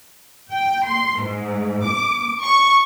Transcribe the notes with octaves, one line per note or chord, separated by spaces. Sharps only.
G5
C6
G#2
D6
C#6